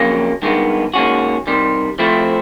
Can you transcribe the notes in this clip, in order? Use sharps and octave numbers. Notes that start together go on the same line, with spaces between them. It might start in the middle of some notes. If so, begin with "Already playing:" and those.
Already playing: F2 C#3 F#3 A#3 C#4
G2 D#3 G#3 B3
D#2 D#3 G#3 C#4 F#4
C3 D#3 G3
F3 A3 C4 E4